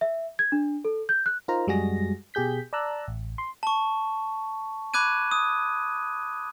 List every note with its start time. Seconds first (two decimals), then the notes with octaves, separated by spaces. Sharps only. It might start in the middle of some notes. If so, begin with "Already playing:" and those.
0.01 E5
0.39 G#6
0.52 D4
0.85 A4
1.09 G6
1.26 F#6
1.48 D#4 F4 A#4 C5 A#5
1.67 F#2 G3 G#3 F#4 G#4 A#6
2.34 B2 G4 G#4 G6 B6
2.73 D5 A5 A#5 E6 F#6
3.08 A1
3.38 C6
3.63 A5 C#6
4.94 B5 D6 F#6 G#6 D#7
5.31 D#6